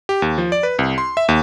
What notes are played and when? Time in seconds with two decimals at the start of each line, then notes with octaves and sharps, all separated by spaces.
0.09 G4
0.22 D#2
0.38 F3
0.52 D5
0.63 B4
0.79 C2
0.98 C6
1.17 E5
1.28 D#2